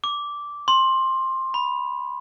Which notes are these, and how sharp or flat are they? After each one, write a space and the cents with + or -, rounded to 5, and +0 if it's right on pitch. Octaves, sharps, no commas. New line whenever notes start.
D6 -10
C6 +15
B5 -5